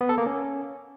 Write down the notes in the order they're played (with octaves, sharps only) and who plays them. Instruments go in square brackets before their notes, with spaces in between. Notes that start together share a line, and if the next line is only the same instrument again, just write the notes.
[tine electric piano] B3
A4
A#3
C#4